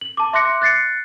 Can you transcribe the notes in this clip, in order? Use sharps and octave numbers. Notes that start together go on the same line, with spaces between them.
F#7
A5 D6
E5 C6 D6 F#6 A#6 C#7
F#6 A6 C7 C#7